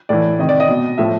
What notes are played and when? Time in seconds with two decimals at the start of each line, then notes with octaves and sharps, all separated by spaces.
0.09 A2 E3 D5
0.39 C3 D#3 D#5
0.49 D5
0.60 D#5
0.69 B2
0.98 A2 F3 E5